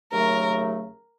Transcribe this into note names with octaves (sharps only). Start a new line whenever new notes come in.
D#2 C#3 F#3 A3 A#4